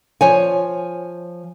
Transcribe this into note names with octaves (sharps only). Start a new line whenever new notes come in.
F3 C#5 G#5